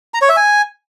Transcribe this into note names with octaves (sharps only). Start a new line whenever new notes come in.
A#5
C#5
E5
G#5